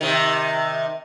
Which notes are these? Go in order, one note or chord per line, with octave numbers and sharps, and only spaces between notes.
C3 D#3